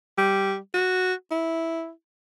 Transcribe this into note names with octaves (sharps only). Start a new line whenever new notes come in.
G3
F#4
E4